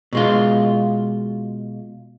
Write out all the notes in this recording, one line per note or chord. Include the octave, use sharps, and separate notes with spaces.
B2 G#3 F4